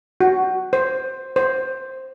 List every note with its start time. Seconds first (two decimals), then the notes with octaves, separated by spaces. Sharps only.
0.21 F#4
0.73 C5
1.36 C5